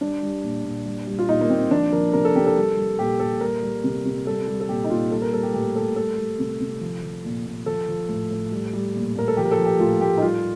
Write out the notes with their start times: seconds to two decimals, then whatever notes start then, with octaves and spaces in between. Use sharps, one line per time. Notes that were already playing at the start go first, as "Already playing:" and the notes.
0.01 G3 D4
0.23 G3
0.44 A#2
0.65 A#2
0.86 G3
1.07 G3
1.19 F4
1.28 A#2 D#4
1.41 A#3
1.49 A#2 C4
1.71 F3 D4
1.92 F3 A#4
2.13 C3 A#4
2.25 A4
2.35 C3 G4
2.46 A4
2.57 G3
2.77 G3
2.99 A#2 G4
3.20 A#2 A4
3.41 G3 A#4
3.63 G3
3.84 C3
4.05 C3
4.26 G3 A4
4.48 G3
4.61 A4
4.69 A#2 G4
4.84 D#4
4.90 A#2 F4
5.11 G3 A4
5.22 A#4
5.33 G3 A4
5.43 G4
5.54 A2 G4
5.76 A2 A4
5.96 G3 A4
6.18 G3
6.39 C3
6.61 C3
6.81 F3
7.03 F3
7.25 A#2
7.46 A#2
7.66 F3 A4
7.88 F3
8.09 A2
8.31 A2
8.52 G3
8.73 G3
8.95 A#2
9.16 A#2 A#4
9.28 A4
9.37 F3 G4
9.45 A#4
9.51 A4
9.58 F3
9.66 G4
9.79 A2 F4
10.01 A2 G4
10.17 D#4
10.22 G3 F4